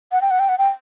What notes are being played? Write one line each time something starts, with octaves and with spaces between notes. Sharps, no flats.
F#5
G5
F#5
G5
F#5
G5